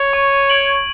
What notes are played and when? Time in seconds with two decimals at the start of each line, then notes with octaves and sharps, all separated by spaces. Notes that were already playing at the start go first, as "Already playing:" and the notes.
Already playing: C#5
0.13 C#6
0.50 G#6 D7 F#7